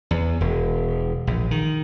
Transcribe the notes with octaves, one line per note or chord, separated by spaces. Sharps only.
E2
E1
A#1
D#3